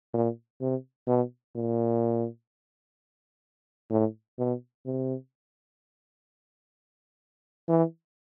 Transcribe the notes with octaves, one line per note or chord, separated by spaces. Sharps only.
A#2
C3
B2
A#2
A2
B2
C3
E3